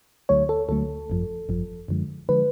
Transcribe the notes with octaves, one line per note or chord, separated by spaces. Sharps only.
D2 D3 F#3 A3 C#5
A4
D2 D3 F#3 A3 A4
G#1 F#2 F3
G#1 F#2 F3
F#2 D3 F3 G#3
D3 F3 G#3 B4